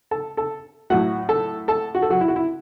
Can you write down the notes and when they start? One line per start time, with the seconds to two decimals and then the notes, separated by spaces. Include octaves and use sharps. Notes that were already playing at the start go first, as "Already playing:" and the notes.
0.11 A4 A5
0.37 A4 A5
0.90 A2 F#3 A3 F#4 F#5
1.29 A4 A5
1.68 A4 A5
1.95 F#4
2.02 A4
2.10 F#3 F#4
2.21 E4
2.28 F#4
2.36 E4